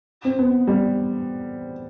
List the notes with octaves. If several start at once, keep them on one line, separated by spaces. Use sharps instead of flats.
C4
B3
G3